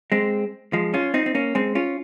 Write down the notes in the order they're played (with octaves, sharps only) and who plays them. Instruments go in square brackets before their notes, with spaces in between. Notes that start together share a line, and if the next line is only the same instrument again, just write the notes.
[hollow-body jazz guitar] G#3 C4
F3 G#3
C#4 F4
C4 D#4
C4
A#3 C#4
G#3 C4
C#4 F4